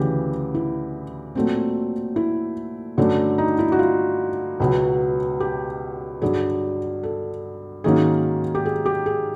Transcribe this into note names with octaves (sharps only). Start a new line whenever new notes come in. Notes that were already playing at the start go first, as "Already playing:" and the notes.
Already playing: D2 C#3 E3 G4
E4
A#2 F#3 A3 C4
E4
G2 D3 F#3 A3 C#4
D#4
E4
F#4
F4
C#2 B2 F#3 B3
G4
G2 D3 F#3 G#4
A4
G#2 D#3 F#3 A#3 C#4 G#4
G4
G#4
G4
G#4